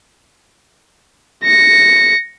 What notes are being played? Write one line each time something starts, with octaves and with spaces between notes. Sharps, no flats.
A#6 C#7